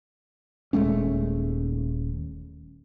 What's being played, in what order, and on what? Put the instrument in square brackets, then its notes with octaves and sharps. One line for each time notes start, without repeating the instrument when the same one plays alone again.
[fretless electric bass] D#1 G#3 A3 C#4